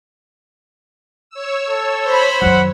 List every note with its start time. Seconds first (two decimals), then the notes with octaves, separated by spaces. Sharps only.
1.30 C#5 E6
1.70 A4
2.06 C5 B5
2.42 F#2 D#3 F#5